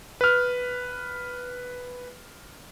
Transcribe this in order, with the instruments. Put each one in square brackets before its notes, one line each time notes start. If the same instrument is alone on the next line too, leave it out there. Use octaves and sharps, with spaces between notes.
[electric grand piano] B4 F6